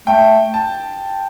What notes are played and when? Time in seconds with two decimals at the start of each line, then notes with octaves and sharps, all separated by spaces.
0.07 A3 G5
0.54 A5